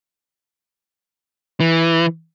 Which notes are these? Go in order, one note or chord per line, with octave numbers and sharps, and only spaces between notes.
E3